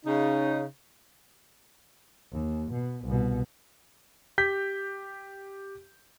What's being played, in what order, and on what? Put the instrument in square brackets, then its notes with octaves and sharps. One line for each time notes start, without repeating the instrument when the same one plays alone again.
[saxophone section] C#3 D#4
[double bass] D#2
B2
C2 B2
[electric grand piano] G4 G6 B6